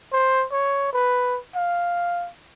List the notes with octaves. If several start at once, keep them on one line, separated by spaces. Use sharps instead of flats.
C5
C#5
B4
F5